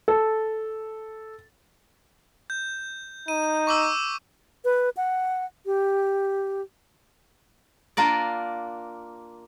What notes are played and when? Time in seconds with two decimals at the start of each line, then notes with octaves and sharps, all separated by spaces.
0.08 A4
2.50 G6
3.28 D#4 D#7
3.67 C#6 D6 E6
4.65 B4
4.97 F#5
5.66 G4
7.97 A#3 D4 F4 A#4 D5